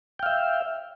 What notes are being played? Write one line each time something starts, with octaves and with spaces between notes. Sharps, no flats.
E5 F5 G5